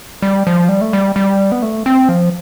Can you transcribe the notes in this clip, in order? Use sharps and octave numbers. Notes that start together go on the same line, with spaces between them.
G3
F3
G3
A3
G3
G3
B3
A3
C4
F3